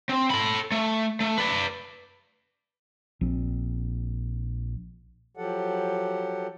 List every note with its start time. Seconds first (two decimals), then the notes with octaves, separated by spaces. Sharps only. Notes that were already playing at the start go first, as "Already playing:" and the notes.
0.09 C4
0.30 A4 B5
0.72 A3
1.20 A3
1.38 B4 D5
3.21 A#1 C4
5.37 F3 F#3 G4 A4 F#5